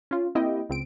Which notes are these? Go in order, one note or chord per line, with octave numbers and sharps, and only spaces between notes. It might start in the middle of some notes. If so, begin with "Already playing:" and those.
C#4 F4
A#3 C4 E4 G4 D#5 G5
C#2 C4 D7